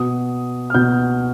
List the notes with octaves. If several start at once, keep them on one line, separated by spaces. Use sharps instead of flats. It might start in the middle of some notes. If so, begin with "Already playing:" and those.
Already playing: B2 D#6
F6
B2 G6